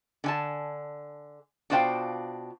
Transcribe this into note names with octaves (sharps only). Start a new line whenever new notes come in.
D3 G#5 A5
B2 D4 F4 C5 F5 G5